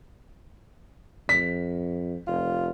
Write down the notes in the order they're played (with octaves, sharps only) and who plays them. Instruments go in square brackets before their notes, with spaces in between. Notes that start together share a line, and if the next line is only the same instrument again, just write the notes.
[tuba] F2 [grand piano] B6
[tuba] F1 [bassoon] F4